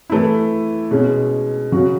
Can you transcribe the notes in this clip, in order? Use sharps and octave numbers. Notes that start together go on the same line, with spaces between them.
E3 A3 E4
B2 G#3 C#4
C#3 F#3 C#4 F#4